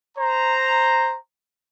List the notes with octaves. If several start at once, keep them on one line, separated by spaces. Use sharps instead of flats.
C5 A#5